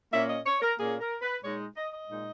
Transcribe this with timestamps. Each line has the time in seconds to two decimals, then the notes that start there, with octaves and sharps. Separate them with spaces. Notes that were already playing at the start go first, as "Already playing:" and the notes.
0.13 A#2 A#3 C#4 E5
0.29 D#5
0.46 C#5
0.62 A#4
0.79 A#2 A#3 C#4 G#4
1.00 A#4
1.22 B4
1.43 A#2 G#3 D#4 C#5
1.76 D#5
1.92 D#5
2.08 A#2 G#3 D#4